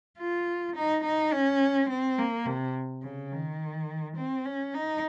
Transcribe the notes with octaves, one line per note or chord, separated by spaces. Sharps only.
F4
D#4
D#4
C#4
C4
A#3
C3
C#3
D#3
C4
C#4
D#4